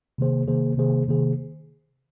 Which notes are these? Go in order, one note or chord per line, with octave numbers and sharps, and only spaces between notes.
C3 D#3 A#3 G#4 C5
C3 D#3 A#3 G#4 C5
C3 D#3 A#3 G#4 C5
C3 D#3 A#3 G#4 C5